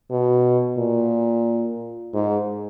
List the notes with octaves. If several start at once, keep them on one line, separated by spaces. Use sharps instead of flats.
B2
A#2
G#2